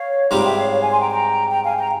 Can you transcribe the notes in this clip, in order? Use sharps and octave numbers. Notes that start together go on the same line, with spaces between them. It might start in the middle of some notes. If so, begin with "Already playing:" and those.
Already playing: C#5 F5
G#2 G3 C4 F4 G5 A#5
E5 G5
C#5 F5
C#5 F5
F5 G#5
G#5 C6
G5 A#5
G5 A#5
G5 A#5
F5 G#5
G5 A#5